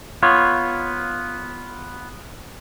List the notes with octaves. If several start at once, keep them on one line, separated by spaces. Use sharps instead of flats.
B3 F4 C#5